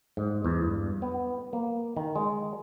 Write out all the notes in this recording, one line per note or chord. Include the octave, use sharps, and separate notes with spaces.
G#2
E2
G2
B3
A#3
D#3
G#3